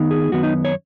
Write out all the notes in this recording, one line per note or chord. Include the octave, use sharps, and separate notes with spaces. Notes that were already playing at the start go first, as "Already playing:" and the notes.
Already playing: D#3 B3 D#4
G#4
F#2 D#3 B3 F#4
D#4
C#5